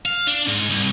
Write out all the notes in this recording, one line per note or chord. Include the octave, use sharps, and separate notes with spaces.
F5
D4
G#2
C2